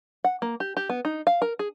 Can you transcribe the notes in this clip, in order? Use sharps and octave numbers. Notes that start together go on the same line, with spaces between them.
F#5
A#3
G4
G4
B3
D#4
F5
A#4
G#4